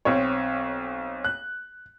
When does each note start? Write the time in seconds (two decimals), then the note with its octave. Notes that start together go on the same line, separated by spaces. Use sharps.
0.05 B1 C4 C#5
1.24 F#6